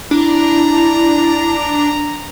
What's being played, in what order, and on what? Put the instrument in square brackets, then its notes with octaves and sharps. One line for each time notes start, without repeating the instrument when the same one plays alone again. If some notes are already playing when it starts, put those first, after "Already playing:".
[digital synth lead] D4 [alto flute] E4 [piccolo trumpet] A#5